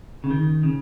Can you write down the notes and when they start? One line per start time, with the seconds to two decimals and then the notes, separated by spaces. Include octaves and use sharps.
0.24 C#3
0.31 D#3
0.63 C#3